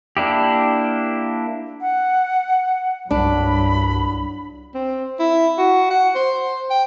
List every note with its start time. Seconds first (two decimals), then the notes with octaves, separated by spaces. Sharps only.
0.17 A#3 D4 E4 G4
1.81 F#5
3.11 C2 G2 F#3 D4 B5
4.74 C4
5.19 E4
5.58 F#4
5.90 F#5
6.15 C5
6.70 G5